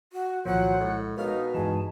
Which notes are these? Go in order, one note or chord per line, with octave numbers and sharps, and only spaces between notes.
F#4
C2 A#2 D#3 F3 F#3 F4 C5 F#5
A2 G#3
B2 D#4 A#4 F5 F6
G2 E3 G#3 D#4 G#4 A5